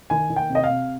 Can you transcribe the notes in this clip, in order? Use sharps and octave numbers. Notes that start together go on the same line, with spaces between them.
D#3 G#5
D#3
G5
C3
D#5
F5
C3